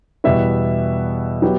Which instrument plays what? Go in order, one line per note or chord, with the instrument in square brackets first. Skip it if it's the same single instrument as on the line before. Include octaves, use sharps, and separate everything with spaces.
[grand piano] E2 B2 G3 B3 E5
F#3 B3 G4